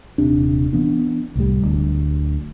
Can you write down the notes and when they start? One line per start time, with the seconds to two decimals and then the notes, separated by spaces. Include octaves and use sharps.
0.18 D#1 C3 D4
0.73 E3 B3 D4
1.36 C2 A2 G3
1.62 D1 D2